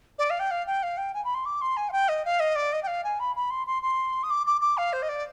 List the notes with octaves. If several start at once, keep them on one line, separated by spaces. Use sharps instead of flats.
D5
F5
G5
F5
G5
F5
G5
G#5
B5
C6
D6
C6
G#5
F5
G5
D#5
F5
D#5
D5
D#5
G5
F5
G#5
B5
B5
C6
C6
C6
D#6
D6
D6
D6
F5
C5
D#5
D5